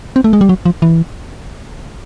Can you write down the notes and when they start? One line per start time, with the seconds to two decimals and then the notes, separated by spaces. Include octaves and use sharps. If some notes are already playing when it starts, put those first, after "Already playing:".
0.16 C4
0.24 A3
0.33 G#3
0.41 G3
0.49 F#3
0.66 F3
0.82 E3